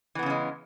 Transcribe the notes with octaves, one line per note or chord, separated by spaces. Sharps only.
C#3 E3 G#3 B3 C#4